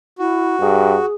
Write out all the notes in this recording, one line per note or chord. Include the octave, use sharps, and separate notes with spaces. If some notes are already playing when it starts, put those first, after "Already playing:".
E4 F#4
G2 G#4